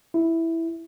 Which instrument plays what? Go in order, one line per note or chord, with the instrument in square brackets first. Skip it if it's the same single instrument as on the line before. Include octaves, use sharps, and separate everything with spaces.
[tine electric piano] E4